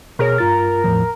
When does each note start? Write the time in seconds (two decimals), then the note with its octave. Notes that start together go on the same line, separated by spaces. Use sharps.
0.19 B2 G#4 A#4 C#5
0.38 G2 F4 A6
0.84 E2 A2 F3